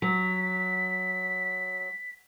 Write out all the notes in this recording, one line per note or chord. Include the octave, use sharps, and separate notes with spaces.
F#3 B6